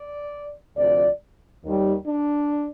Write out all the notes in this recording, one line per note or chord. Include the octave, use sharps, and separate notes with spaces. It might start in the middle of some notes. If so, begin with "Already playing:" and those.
Already playing: D5
D2 C3 F3 D5
D#2 D#3 G3
D4